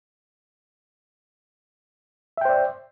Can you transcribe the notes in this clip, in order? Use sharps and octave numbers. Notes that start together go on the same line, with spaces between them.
C5 D5 E5 G5